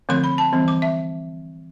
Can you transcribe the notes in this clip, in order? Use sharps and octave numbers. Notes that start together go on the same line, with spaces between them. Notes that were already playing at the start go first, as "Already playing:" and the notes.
D3 F3 A3 C4 C6
B5
A5
E3 G3 C4
D6
E5